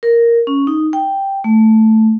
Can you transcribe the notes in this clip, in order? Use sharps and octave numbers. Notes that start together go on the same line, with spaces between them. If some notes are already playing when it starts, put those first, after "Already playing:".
A#4
C#4
D#4
G5
A3